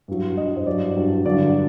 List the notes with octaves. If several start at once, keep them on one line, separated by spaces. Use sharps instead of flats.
G2 F#3
G2 F#3 D#5
C5
G2 F#3 D5
G2 F#3
G2 D3 F#3 D5